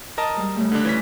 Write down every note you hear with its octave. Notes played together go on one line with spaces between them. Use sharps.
A#4 D#5 A5
G3 G#3
C#3 G3 A3
D3 D4
E3 C#4 B6